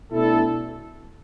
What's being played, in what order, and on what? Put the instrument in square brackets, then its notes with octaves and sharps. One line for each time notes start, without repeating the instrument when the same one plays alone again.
[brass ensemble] B2 A3 D4 E4 A4